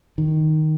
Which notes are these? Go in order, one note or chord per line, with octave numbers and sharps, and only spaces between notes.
D#3